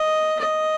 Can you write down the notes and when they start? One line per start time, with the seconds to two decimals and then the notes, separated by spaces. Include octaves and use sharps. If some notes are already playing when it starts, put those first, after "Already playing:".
Already playing: D#5
0.39 D#5